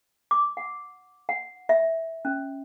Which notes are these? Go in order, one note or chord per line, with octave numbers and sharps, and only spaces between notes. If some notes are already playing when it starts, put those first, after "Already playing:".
D6
F#5
F#5
E5
C#4